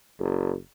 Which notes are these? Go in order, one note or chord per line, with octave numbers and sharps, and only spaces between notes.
F#1